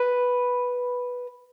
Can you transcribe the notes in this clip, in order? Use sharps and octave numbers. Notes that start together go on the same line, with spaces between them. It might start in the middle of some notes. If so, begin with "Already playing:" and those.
Already playing: B4